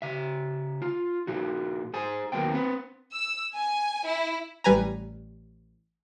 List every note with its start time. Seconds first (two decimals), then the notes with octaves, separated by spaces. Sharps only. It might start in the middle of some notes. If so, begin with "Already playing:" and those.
0.02 C#3 E5
0.82 F4
1.27 A#2 F3 F#4
1.94 G#4 C5 G#5
2.32 D#2 F#3 A#3 B3 G5
2.52 C4 B4
3.12 E6
3.54 G#5
4.05 E4
4.64 A1 G3 B4 G#5 A#5